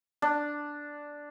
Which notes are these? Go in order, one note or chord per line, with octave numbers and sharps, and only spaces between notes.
D4